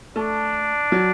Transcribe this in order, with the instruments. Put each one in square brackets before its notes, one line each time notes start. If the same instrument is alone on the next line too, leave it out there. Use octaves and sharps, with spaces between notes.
[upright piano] A3 [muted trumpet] D4
[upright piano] F#3